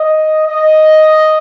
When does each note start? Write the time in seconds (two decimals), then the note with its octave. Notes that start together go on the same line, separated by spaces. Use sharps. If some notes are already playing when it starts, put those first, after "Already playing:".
Already playing: D#5
0.48 D#5